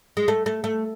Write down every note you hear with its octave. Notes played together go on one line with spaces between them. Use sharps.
G#3
A3
A3
A3